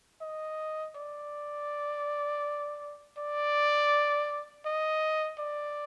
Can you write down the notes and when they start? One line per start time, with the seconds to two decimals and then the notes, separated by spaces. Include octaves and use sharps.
0.21 D#5
0.96 D5
3.18 D5
4.66 D#5
5.39 D5